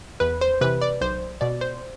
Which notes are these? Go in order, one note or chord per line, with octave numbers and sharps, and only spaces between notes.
E2 B4
C5
C3 E3 B4
D5
B1 C5
B2 D5
C5